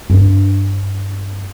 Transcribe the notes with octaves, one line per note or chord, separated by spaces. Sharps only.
G2 D4